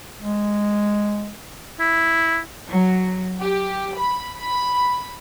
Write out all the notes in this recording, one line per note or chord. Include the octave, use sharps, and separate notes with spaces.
G#3
E4
F#3
G4
B5
B5